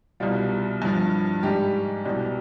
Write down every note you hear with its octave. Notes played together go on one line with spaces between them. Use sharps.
C2 B2 G3 F4
G2 F3
G#2 G3 G4
C2 B2 G3